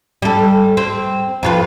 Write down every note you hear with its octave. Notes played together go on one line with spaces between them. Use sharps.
G3 A4
C4
F2 F4 B4